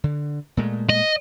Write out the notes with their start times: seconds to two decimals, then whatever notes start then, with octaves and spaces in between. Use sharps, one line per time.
0.04 D3
0.57 A#2 G#3 A3
0.90 D#5